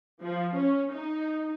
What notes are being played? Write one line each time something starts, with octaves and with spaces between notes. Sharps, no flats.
F3
C#4
D#4